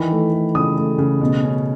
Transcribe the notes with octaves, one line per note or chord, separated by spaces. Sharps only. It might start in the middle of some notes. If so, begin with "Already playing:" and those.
Already playing: D#3 E3 B5
A3
A3
C#3 D#6
A3
C#3
B2
C#4